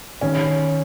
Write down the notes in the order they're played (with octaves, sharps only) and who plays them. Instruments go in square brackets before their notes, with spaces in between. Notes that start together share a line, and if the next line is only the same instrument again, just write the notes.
[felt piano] D#3 [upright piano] C#4